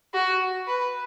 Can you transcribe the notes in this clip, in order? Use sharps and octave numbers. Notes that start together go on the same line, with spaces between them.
F#4
B4